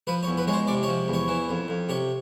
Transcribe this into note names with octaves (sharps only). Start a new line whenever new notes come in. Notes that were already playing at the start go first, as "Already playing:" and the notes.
F3 B4
C#5
E2
B4
G#3 C#5
C5
C3 D5
C#5
F3
E2
C#5
E3
F2
F2
C3 C#5